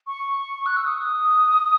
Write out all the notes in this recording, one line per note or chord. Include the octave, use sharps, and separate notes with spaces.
C#6
F#6
E6
D#6